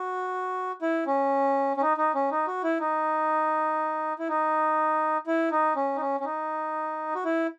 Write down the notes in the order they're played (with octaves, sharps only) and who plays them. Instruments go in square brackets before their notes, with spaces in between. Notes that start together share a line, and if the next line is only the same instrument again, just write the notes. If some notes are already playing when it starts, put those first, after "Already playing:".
Already playing: [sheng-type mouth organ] F#4
E4
C#4
C#4
D#4
D#4
C#4
D#4
F#4
E4
D#4
E4
D#4
E4
D#4
C#4
D#4
C#4
C#4
D#4
F#4
E4